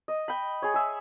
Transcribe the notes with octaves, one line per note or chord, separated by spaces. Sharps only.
D#5
G5 B5
G#4 C#5
G#4 E5